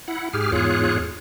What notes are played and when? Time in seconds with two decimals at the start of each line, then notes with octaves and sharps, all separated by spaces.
0.08 E4 F#5
0.33 G#2 G4 G#4 F6
0.52 E2 G#2 F4 G#4 C#5 F#6